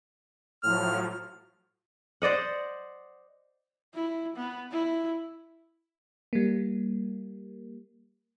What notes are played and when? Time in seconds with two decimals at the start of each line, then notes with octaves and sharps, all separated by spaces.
0.63 A2 F3 F#3 F6
2.22 C5 D5 D#5 F#5
3.94 E4
4.36 B3
4.71 E4
6.33 G3 A#3